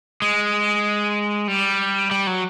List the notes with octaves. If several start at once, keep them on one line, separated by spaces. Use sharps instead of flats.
G#3
G3
G3
F#3